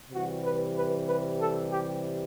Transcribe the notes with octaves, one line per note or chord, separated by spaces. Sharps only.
C3 E3 G3 F#4
B4
B4
B4
A4
G4